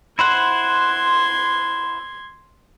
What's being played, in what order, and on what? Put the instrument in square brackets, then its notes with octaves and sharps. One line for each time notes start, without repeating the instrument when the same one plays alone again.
[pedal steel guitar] E4 C5 F#5 [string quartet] C6 G#6